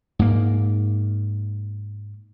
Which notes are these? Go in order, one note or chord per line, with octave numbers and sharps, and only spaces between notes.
G#2 A#3